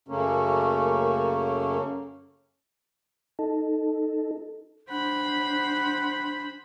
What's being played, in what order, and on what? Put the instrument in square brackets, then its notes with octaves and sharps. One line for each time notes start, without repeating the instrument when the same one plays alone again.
[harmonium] F#2 C#3 A3 A#3 C#4
[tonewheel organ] D#4 A4
[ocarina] D4 [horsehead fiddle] C5 B5 [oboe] F#5